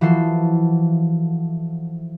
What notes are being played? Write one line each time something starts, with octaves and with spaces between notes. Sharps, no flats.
E3 F3 F#4 A4 C7